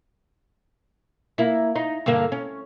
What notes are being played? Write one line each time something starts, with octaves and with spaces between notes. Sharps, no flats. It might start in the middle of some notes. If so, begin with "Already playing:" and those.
A#3 E4
D#4
G2 D3 A#3
C#4